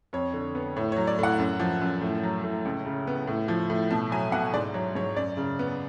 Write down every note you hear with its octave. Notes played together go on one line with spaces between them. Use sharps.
F2 C#5
D3
B3
A2 C#5
C#5
F#3
D5
A2 F#5
F#2
F3
F#2
A2
F#3
A2
C#2
C#3
B3
A2
F3
A2
B2 A5
F#3 G#5
B2 F#5
G#2 D5
F#3 C#5
G#2 C#5
F#2 D5
C#3
B3